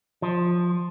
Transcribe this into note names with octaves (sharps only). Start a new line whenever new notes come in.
F3